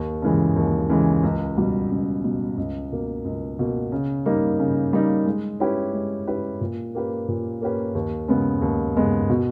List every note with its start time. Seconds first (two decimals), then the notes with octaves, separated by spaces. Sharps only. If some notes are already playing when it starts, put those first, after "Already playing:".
Already playing: D#2
0.22 C#3 E3 G#3
0.56 D#2
0.90 C#3 E3 G#3
1.23 C#2
1.57 B2 G3
1.91 C#2
2.24 B2 G3
2.57 C#2
2.92 B2 A#3
3.25 C#2
3.59 B2 A#3
3.92 C#3
4.26 G3 A#3 D#4
4.60 C#3
4.93 G3 A#3 D#4
5.26 G#3
5.60 C#4 E4 G4 B4
5.93 G#3
6.27 C#4 E4 G4 B4
6.61 A#2
6.95 A#3 C#4 G4 B4
7.28 A#2
7.62 A#3 C#4 G4 B4
7.95 D#2
8.28 C#3 G#3 B3
8.62 D#2
8.95 C#3 G#3 B3
9.30 B2